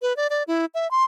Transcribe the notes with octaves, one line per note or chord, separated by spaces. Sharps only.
B4
D5
D5
E4
E5
C6